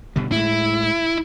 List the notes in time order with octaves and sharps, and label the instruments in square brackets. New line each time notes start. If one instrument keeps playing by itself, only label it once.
[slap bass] B2 D3 G3
[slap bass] A2 G#3 [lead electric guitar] E4